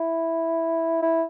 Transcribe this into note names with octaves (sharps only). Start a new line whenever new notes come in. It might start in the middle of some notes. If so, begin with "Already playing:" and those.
Already playing: E4
E4